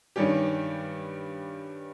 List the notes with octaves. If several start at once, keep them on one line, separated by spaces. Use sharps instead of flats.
G2 D#3 G3 C#4 G4